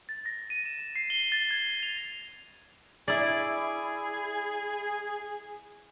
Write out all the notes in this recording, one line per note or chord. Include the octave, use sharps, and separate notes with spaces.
A6
A#6
D#7
E7
C7
G7
A6
G#6
F7
E4 G#4 D5